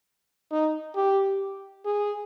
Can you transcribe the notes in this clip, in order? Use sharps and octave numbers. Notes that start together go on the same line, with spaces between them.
D#4
G4
G#4